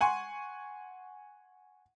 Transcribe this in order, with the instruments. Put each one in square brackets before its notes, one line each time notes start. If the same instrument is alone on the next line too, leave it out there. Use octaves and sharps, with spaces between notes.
[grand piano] F#5 G#5 C6 C#6